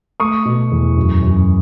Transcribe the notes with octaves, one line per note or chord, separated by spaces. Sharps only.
A3 C#6 D#6
B2
E2
F#2
F#2